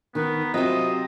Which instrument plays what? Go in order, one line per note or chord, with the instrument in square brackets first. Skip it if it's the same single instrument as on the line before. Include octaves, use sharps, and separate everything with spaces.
[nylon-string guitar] D#3 [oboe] B3
[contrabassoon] C3 [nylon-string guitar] F#3 [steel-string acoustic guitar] C4 F4 [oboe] D#5